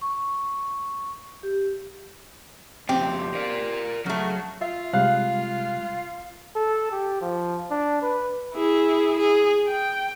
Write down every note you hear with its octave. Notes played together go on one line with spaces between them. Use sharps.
C#6
G4
F2 C#3 C4 G4
A#4 D5
C#3 F#3 A3
F4 E5
C3 G3 G#3 F5 F#6
A4
G4
F3
D4
B4
E4 G#4
G#4
G5